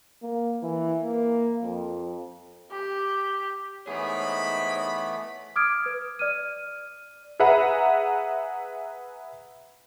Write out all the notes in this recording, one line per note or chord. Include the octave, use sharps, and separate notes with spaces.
A#3
E3
A#3
F2
G4
E3 A3 B3 D#4 G#4 C#5 B5
D6 D#6 F6 G#6 D7
B4
D5 F6 D#7
G#4 B4 E5 F#5 A#5 B5